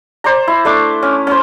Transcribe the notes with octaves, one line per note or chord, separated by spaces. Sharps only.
C5 D5 A#5
E4
A3 D4 D6
C#4
C#4 C5